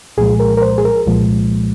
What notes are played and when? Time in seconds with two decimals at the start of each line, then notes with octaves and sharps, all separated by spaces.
0.17 C2 A#2 F3 G#3 G#4
0.40 A#4
0.57 A#4
0.62 C5
0.78 G#4
0.85 A#4
1.07 C2 A#2 F3 G#3